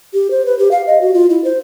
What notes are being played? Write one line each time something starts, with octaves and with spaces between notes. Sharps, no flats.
G4
C5
B4
G4
F5
D#5
F#4
F4
E4
C5